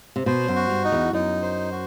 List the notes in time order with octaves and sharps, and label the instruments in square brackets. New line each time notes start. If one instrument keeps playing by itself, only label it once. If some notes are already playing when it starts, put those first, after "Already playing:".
[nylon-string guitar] C3
[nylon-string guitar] B2 [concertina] C5
[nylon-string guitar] F#2
[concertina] F#4
[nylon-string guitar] G2
[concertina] D#4
[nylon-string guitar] E2
[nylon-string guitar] F#2 [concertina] D#4
[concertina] C5
F#4